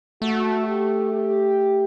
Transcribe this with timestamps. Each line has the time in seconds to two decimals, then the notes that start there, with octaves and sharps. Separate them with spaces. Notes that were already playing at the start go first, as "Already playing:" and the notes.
0.22 A3 F#4
0.67 G4
1.12 G4